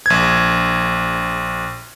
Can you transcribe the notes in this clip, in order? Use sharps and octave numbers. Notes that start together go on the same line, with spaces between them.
A#1 G#6